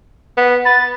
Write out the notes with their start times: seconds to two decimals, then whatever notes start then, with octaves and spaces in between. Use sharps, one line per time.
0.37 B3
0.65 B4 A6